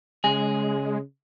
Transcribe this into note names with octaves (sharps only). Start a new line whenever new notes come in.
C#3 G#3 G#4 G#5 A#6